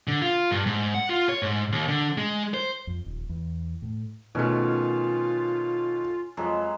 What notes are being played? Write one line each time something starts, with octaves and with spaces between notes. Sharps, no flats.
D3
F4
G2
G#2
F#5
F4
C#5
G#2
D#2
D3
G#3
C5
F2
D#1
E2
A2
B2 D#3 A3 C#4 F4
F2 F#3 G#3 E5